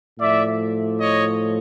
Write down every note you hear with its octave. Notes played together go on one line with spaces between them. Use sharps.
A2 F3 D5 E5
C#5 D#5